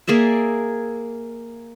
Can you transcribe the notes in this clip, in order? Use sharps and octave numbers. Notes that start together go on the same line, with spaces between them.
A#3 G#4 D5 E5